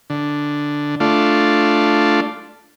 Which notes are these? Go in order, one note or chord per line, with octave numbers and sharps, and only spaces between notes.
D3
A3 D4 F4